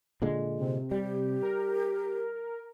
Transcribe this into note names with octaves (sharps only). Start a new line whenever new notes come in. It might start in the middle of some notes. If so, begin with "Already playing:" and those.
A#2 D3 G#3
C3
G3 G4
A#4